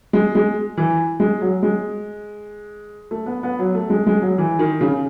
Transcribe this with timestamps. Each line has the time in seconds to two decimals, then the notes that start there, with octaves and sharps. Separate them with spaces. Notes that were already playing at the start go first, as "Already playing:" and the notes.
0.13 G#3
0.35 G#3
0.77 E3
1.20 G#3
1.41 F#3
1.63 G#3
3.11 A3
3.26 B3
3.43 B3
3.59 F#3
3.75 A3
3.90 G#3
4.07 G#3
4.22 F#3
4.38 E3
4.59 D#3
4.81 C#3